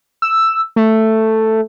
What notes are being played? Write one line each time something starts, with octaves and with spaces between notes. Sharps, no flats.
E6
A3